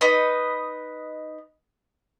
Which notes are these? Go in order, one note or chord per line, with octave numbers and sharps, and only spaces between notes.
D#4 B4 D#5